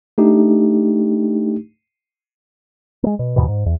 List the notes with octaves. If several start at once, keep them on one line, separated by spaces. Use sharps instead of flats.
A3 D4 D#4 G4
G#3 A#3
B2
D#2 G#2 B2 E3
G#2
E2